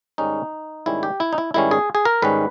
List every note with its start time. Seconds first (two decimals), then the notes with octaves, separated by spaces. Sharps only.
0.18 G#2 D#3 G3 C#4 D#4
0.86 G#2 D#3 G3 C#4 E4
1.03 G4
1.20 E4
1.33 D#4
1.38 E4
1.54 G#2 D#3 G3 C#4 E4
1.71 G#4
1.95 G#4
2.05 A#4
2.22 G#2 D#3 G3 C#4 B4